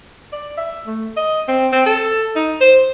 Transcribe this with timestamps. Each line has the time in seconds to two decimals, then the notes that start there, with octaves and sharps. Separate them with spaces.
0.32 D5
0.58 E5
0.87 A3
1.17 D#5
1.48 C4
1.72 C4
1.86 A4
2.35 D#4
2.60 C5